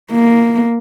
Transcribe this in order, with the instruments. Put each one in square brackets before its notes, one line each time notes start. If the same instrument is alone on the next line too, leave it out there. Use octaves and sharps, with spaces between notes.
[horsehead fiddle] A#3